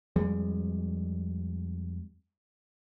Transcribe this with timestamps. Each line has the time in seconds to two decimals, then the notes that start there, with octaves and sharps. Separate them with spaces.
0.16 F2 G3 G#3